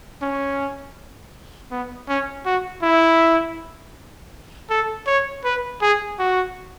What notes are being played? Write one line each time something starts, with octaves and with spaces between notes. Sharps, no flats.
C#4
B3
C#4
F#4
E4
A4
C#5
B4
G#4
F#4